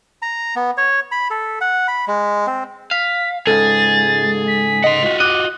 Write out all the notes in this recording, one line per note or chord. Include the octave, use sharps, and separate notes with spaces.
A#5
B3
C#5
B5
A4
F#5
B5
G#3
C4
F5 B6
C#2 G#2 G#4 A4 A6
B6
D#5 F#5 C6
F4 F#4
D#5 D6 F#6